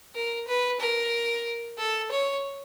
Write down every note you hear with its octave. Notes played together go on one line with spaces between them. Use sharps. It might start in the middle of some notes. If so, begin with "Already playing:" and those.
A#4
B4
A#4
A4
C#5